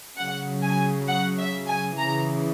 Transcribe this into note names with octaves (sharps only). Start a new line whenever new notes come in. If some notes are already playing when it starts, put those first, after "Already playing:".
C#3 F#3 F#5
G#5
F#5
E5
G#5
C#3 E3 A#5